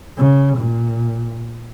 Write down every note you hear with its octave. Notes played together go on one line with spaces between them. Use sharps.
C#3
A#2